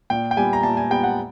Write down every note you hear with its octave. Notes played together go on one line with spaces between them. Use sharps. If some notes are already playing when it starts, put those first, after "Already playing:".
A#2 G5
G5
G3 B3 G#5
A#5
A#2 A5
G#5
G3 B3 G5
F#5